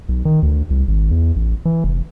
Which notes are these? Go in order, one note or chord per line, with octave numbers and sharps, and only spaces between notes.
B1
D#3
D2
C2
G#1
E2
A1
E3
F1